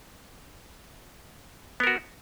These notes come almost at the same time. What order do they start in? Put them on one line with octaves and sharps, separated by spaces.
B3 A#4 F#4